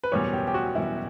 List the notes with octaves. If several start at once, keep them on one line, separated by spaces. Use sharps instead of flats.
B4
F#1 E2 B2 G3 C#5
G4
G4
F#4
F#1 E2 B2 G3 E4